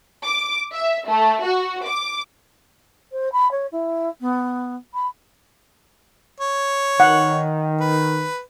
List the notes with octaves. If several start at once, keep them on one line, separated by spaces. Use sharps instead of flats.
D6
E5
A3
F#4
D6
C5
B5
C#5
E4
B3
B5
C#5
D#3 F#5
B4